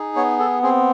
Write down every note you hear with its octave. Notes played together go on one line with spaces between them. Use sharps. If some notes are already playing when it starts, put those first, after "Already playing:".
Already playing: D#4 G#4
B3 C#5
A4
C4 G#4